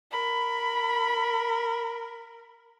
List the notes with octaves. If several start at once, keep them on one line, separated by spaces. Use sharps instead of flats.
A#4 B5